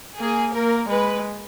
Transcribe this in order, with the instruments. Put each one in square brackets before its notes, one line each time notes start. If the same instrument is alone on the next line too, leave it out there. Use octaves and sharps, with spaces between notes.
[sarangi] A#3 [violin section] G#4
[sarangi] A#3 [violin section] A#4
[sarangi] G#3 [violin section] B4